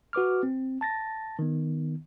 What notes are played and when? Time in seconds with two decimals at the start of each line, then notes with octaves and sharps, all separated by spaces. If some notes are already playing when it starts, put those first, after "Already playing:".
0.13 F#4 B4 D6 F6
0.43 C4
0.81 A5 A6 A#6
1.39 D#3 B3